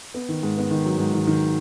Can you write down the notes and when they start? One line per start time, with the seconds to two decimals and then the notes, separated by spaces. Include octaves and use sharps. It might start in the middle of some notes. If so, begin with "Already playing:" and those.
0.14 B3
0.29 D#3
0.43 G#2
0.57 B3
0.70 D#3
0.85 F#3
0.98 G#2
1.13 D#3
1.27 D#3